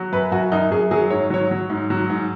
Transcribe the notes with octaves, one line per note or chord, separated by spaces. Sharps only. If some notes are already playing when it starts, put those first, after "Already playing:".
Already playing: F#3
F#2 B4
F#2 F#4
F#2 D#4
F#2 G#4
F#3 G#4
G#2 C#5
F#3 C#5
F#3
G#2
F#3
G#2